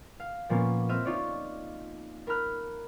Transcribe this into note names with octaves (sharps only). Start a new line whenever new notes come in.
F5
A#2 F3 A#3 B3 C#4
C4 E5 F6 D#7
D#4 F4 C#5 D5
A#4 A#5 B5 F6 F#6